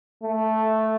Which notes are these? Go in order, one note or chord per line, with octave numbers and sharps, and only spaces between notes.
A3